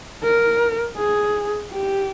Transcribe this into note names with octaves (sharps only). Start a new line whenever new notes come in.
A#4
G#4
G4